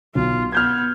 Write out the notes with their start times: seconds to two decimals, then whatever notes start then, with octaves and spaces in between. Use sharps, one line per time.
0.15 B1 F4
0.52 B3 F6 G6 G#6